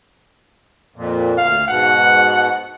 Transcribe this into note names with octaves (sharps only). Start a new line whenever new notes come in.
F2 A#2
D2 F5
G#2 B2 F#5